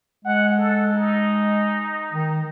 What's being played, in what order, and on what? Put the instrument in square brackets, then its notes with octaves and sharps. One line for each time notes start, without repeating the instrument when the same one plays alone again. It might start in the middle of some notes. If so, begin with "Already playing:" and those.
[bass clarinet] G#3 [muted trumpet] F#5
[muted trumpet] A4
D#4
[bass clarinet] D#3